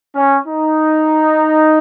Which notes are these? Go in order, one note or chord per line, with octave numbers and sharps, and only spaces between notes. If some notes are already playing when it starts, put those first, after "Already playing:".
C#4
D#4